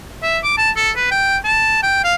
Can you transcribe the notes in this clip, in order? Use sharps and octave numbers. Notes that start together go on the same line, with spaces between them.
E5
D6
A5
A4
B4
G5
A5
G5
F5